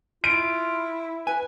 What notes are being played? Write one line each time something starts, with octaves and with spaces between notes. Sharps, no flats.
E4 F4 D7
B4 G#5